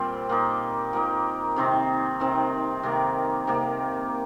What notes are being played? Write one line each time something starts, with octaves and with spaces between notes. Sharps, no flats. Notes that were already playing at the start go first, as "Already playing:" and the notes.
Already playing: A#2 G3 C4 G4
A#2 A#3 D#4
A#2 A#3 D#4
C3 D#3 C4 D#4
C3 D#3 C4 D#4
C3 D#3 A#3
C3 D#3 A#3